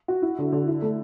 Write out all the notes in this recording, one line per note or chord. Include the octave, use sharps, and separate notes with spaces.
F#4
E4
D3
D3
E4
A3